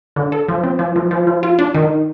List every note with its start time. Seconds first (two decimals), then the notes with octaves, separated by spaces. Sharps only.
0.16 D3
0.32 A4
0.49 F3
0.64 C4
0.79 F3
0.96 F3
1.11 F3
1.27 F3
1.43 F4
1.59 D4
1.74 D#3